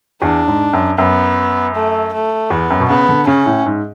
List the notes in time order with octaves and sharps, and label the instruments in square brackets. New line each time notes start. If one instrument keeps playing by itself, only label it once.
[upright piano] E2 [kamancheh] D4
[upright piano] G#2
F#2
[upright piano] F#2 [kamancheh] B3
[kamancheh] A3
A3
[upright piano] E2 [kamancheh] B3
[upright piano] F#2
B2
[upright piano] C#3 [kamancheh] B3
[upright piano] D3
[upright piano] C#3 [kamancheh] C#4
[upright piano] A2
G#2